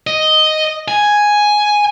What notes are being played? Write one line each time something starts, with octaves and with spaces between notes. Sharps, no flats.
D#5
G#5